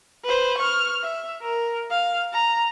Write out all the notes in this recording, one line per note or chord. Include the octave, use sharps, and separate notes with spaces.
B4 C5
C#6 F6
E5
A#4
F5
A#5